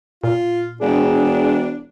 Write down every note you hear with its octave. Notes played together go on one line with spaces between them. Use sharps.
A#2 F4
E1 D4 G#4